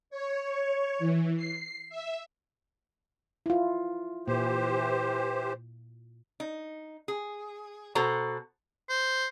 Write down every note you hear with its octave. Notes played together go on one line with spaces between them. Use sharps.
C#5
E3
C7
E5
E4 F4
A#2 E3 G4 C5
D#4
G#4
B2 F#4 A4 C5 A#5
C5